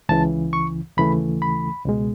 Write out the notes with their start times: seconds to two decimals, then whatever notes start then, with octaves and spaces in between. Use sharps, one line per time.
0.09 C#2 C#3 E3 A5
0.53 C#6
0.97 D#2 C#3 E3 A3 B5
1.42 B5
1.86 C#2 B2 G#3